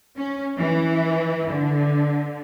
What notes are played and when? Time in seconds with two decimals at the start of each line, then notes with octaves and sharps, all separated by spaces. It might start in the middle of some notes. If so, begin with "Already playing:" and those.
0.16 C#4
0.58 E3
1.49 D3